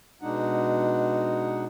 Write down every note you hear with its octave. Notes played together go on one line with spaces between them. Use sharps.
B2 G#3 D4 D#4 F#5